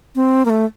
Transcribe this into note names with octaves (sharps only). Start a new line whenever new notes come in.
C4
A#3
A3